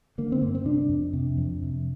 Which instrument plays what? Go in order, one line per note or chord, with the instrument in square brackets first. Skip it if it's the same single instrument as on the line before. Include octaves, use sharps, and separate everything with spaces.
[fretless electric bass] D3 A#3
C4
G2 A#3
C4
C3 D4
F2
C3
F2
C3